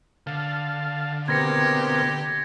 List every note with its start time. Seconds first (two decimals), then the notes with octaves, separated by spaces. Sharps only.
0.27 D3 F5 A5
1.28 B2 A#3 C4 G4 G#6 A#6 C#7